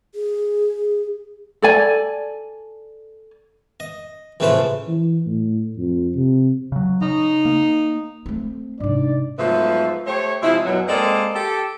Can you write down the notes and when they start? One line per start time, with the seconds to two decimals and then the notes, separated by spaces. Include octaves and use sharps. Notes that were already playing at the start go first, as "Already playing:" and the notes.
0.15 G#4
1.62 A4 D5 G#5
3.80 D#5
4.40 A#1 A2 C#3 A3 B4 C5
4.88 E3
5.26 A2
5.78 F2
6.15 C3
6.72 C#3 F#3
7.02 C#3 D#4
7.45 A#3
8.26 A3 C4
8.80 G#2 C3 D4 D#4 D5
9.39 G#2 F3 F#3 A3 B3 E5
10.07 A3 G4 C5 C#5
10.43 C3 F3 G#3 E4
10.65 F#2 B2 F#3
10.89 G#3 A#3 C4 A4 D5 D#5
11.35 G4 A4